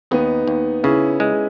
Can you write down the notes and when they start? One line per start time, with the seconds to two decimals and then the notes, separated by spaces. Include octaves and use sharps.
0.11 D#2 B3 D#4
0.47 D#2
0.83 C#3 C#4 E4
1.20 G#3